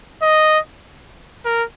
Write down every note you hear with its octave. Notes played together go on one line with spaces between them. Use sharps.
D#5
A#4